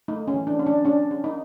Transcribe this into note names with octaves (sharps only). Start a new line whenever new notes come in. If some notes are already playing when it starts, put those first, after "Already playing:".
A3 D#4
C#4
E3
D4
C#4
D4
C#4 D4
C#4
D#4